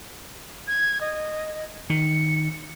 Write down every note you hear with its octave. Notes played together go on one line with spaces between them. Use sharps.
G#6
D#5
D#3 C#7